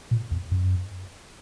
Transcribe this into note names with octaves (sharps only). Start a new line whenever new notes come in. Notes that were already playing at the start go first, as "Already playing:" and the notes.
A#2
E2
F#2